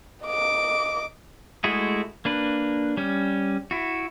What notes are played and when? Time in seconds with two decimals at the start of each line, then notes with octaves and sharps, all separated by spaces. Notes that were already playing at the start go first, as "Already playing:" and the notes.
0.24 D#5 D6
1.64 G#3 A3 E4 F#4 G#4
2.25 A#3 D4 B4
2.97 G3 C#4
3.71 E4 F#4